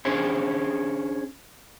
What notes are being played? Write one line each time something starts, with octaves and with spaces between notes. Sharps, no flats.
C#4 D4 G#4 C5 C#5